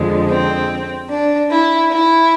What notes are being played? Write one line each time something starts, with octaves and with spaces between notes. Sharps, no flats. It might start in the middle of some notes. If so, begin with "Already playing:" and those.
Already playing: F2 D3 G#3
C4
D4
E4
E4